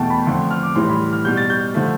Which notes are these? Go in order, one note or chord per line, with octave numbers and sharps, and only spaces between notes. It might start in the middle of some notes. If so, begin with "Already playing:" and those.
Already playing: E2 B2 A3 G5 A5
B5
F2 D3 A3 C6
F6
D6
A2 E3 G3 C6
B5
F6
B2 G3 G6
A6
G6
D3 F3 A3